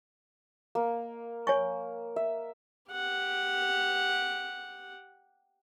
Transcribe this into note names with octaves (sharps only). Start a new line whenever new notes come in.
A#3
C#5 G#5 C#6
E5
G4 F#5